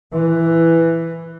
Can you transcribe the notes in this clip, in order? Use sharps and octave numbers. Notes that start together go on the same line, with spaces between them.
E3